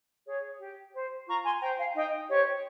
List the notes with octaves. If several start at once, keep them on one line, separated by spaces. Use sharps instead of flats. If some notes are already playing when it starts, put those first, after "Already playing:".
G#4 C#5
G4
C5
F4 A#5 C#6
G#5 C6
C5 G5 A#5
F5 G#5
D#4 D#5 G5
G4 C5 C#5